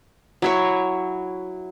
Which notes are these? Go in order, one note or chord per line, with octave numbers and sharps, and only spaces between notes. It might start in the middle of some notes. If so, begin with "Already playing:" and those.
F#3 E4 C#5